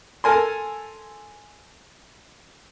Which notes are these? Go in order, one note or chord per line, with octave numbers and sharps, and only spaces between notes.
A4 A#4 G#5 C6